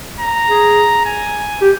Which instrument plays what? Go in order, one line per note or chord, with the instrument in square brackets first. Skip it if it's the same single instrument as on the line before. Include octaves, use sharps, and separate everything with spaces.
[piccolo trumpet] A#5
[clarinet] G#4
[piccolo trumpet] G#5
[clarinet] G4